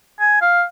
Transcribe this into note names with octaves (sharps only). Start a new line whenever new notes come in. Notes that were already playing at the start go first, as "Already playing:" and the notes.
G#5
F5